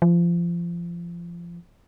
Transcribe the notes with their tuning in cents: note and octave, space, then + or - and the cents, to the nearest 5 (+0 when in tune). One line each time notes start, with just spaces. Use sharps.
F3 -25